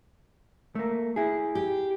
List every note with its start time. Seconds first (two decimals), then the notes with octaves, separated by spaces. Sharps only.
0.75 A3 A#3
1.16 E4 G#4
1.55 G4